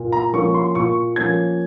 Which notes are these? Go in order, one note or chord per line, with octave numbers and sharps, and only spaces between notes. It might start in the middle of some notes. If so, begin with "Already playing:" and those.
Already playing: A#2
A#5
F3 A#3 C#4 C#6
C6
A#2 C#6
F3 A#3 C#4 G#6